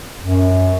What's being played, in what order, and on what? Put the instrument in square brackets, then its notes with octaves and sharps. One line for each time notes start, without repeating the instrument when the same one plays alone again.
[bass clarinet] F#2